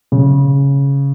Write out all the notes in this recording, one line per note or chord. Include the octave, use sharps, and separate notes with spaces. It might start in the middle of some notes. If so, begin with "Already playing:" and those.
C#3